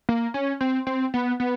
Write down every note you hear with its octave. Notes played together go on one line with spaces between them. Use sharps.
A#3
C#4
C4
C4
B3
B3